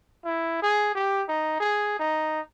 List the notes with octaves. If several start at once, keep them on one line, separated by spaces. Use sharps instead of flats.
E4
G#4
G4
D#4
G#4
D#4